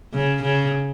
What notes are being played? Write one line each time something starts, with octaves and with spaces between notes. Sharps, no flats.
C#3
C#3